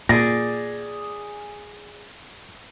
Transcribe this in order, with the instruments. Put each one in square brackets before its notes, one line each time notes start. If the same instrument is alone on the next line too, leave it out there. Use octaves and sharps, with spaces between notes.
[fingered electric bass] A#2 [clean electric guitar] G#4 D5 [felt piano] A#6